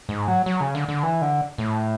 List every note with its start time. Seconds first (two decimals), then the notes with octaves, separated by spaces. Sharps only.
0.09 G#2
0.28 F#3
0.46 F#3
0.61 C#3
0.75 D3
0.88 D3
1.03 E3
1.22 D3
1.58 A2